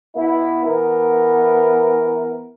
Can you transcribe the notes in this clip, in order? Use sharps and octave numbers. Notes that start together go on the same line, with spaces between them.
B2 B3 E4
E3 B3 A#4